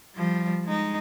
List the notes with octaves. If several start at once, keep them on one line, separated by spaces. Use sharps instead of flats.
F3 G3
G#3 D#4